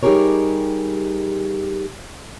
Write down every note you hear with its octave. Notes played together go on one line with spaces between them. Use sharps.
G3 D#4 G4 G#4 A#4 C#5